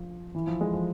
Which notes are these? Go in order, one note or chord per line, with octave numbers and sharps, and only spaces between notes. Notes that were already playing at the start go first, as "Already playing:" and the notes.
Already playing: F3
E3
F3
G#3
F3